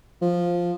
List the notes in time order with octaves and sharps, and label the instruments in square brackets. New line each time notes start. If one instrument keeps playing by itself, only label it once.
[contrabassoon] F3